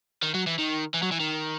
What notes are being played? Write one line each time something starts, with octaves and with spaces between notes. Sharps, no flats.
D#3
F#3
E3
D#3
E3
F#3
E3
D#3